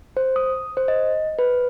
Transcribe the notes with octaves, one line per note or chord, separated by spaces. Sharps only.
C5
D#6
C5
D#5
B4